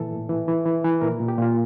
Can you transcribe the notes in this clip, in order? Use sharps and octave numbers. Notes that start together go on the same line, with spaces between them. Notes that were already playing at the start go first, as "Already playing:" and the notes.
Already playing: A#2 E3 A4
A2
E3
E3
E3
E3
A#2 A#4
A#2
G4
A#2 F4